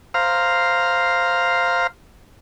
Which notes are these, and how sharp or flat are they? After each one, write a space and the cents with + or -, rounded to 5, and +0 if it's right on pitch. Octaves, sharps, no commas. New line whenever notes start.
C5 +0 F5 +0 A#5 +0